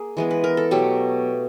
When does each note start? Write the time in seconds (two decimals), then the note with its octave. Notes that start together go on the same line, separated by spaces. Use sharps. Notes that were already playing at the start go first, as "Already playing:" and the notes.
Already playing: A#3 G#4
0.17 E3 G#3 B3
0.31 B4
0.44 A#4
0.57 A4
0.71 B2 F#3 A3 G4